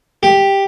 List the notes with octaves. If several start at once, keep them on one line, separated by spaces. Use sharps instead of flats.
G4